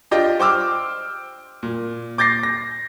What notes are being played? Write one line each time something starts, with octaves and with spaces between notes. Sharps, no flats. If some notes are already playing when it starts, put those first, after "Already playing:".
D4 F4 G4 D#5 G5
C5 G5 D6 E6 F6
A#2
D6 G6 A6 A#6 C7
A#6